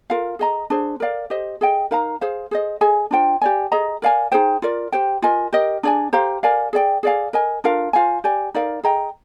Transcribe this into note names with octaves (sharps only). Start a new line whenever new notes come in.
F4 A#4 F5
G#4 D#5 A#5
D4 G#4 C5
A#4 D5 F5
G4 C5 D#5
G#4 D#5 G5
D#4 A#4 F5 A#5
G#4 C5 F5
G#4 C5 D#5
G#4 D#5 G#5
D4 F4 C5 G5
G4 D5 G#5
G#4 D#5 A#5
A#4 D5 F5 G#5
D#4 G#4 C5 G5
F4 A#4 D5
G4 C5 G5
F4 A#4 D#5 G#5
G4 A#4 D#5
D4 G#4 D5 G#5
G4 C5 F5 A#5
A#4 D5 F5 G#5
G#4 D5 G5
G#4 D5 F5 G#5
A#4 D#5 G#5
D4 F4 A#4 F5
F4 C5 F5 G#5
G4 D5 G#5
D#4 A#4 D5 F5
G#4 D#5 G5 A#5